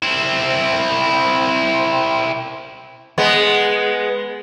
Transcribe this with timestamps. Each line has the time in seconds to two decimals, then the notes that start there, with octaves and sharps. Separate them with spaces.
0.03 C4 E4
3.18 G#3 B3